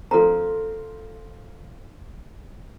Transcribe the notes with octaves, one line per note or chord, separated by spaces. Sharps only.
F3 C4 A4 A#5